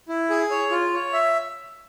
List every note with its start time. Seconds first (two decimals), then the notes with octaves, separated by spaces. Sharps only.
0.09 E4
0.30 G#4
0.50 C#5
0.71 F4
0.93 C#5
1.13 E5